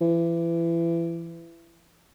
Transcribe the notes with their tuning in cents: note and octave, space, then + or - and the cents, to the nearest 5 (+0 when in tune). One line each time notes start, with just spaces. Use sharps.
E3 +30